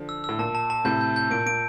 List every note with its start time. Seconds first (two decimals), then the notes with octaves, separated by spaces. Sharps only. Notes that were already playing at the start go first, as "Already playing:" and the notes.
Already playing: D3 F3
0.09 E6
0.24 A2 E6
0.39 A#2 A5
0.55 A5
0.70 A5
0.85 A2 C3 G6
1.01 G6
1.16 G6
1.31 A#2 D7
1.46 A#2 D7